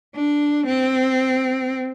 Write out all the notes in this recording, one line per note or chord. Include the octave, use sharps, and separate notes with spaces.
D4
C4